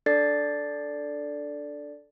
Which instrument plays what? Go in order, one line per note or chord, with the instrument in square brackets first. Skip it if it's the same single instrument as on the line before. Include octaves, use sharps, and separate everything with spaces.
[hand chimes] D4 A4 D5 A6 C7